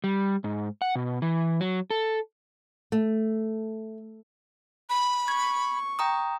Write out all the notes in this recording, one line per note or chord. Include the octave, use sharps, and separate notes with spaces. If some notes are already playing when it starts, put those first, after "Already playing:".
G3
G#2
F#5
B2
E3
F#3
A4
A3
B5
C#6 G#6
G5 A#5 D#6